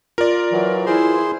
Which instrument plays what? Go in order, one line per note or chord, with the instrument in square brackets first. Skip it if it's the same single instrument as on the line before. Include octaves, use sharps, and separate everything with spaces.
[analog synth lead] F4 [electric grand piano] A#4 D5
[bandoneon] E3 F#3
[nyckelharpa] E4 [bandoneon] G#4 C5 C6